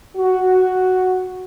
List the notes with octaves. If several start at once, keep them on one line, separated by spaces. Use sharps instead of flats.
F#4